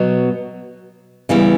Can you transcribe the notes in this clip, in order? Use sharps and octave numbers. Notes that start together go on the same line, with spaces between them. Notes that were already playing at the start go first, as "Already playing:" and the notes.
Already playing: B2 F#3 B3
C#3 E3 G3 B3 E4